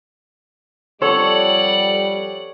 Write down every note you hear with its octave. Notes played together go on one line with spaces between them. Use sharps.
F2 G3 A4 C#5 D5 F#5